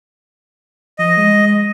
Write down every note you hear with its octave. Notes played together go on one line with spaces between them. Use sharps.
F3 D#5
G#3